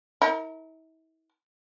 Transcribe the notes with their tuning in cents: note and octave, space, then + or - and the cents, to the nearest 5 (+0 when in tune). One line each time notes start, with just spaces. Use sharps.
E4 -40 A#4 -20